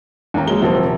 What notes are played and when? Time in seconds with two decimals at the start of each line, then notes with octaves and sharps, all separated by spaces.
0.34 A1 D#2 A#5
0.47 F#3 G#3 A#3 G7
0.62 D#1 C3 F3 F#3 C4